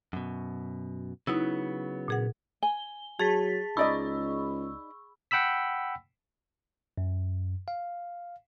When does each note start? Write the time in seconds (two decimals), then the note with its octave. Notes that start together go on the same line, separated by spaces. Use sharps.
0.13 F#2 B2
1.27 C#3 F#3 B3 D#4 E4
2.08 A#2 G#4 F#5
2.63 G#5 G7
3.19 F#3 G#4 A5 A6 B6
3.77 C#2 D#4 D5 D#5 B5 C#6 E6
5.31 F#5 G5 B5 E6 B6
6.98 F#2
7.68 F5